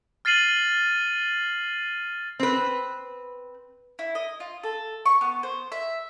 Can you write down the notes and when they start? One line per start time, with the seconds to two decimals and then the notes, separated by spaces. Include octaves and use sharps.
0.25 F6 A6 C7 D#7 F#7
2.40 C4 B4
3.99 E4
4.15 D#5
4.40 F4
4.63 A4
5.06 C#6
5.21 B3
5.43 C5
5.72 E5